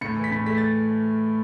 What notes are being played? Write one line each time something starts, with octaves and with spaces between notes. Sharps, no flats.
A2 C#7
E3
B6
A2
A3 B6
A6